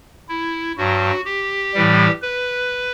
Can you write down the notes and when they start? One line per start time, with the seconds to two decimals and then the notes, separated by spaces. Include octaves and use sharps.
0.29 E4
0.77 G2 F#3 F#4
1.25 G4
1.74 A2 E3 G3
2.22 B4